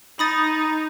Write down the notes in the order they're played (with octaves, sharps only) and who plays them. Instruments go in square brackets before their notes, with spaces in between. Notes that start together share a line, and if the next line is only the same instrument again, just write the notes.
[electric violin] D#4 [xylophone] B5 D#6 A6